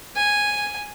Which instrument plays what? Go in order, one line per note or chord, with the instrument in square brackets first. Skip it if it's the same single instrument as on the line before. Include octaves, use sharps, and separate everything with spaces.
[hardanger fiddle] G#5